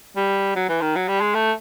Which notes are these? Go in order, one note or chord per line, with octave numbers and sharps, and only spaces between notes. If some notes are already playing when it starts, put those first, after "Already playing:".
G3
F#3
E3
D#3
F#3
G3
G#3
A3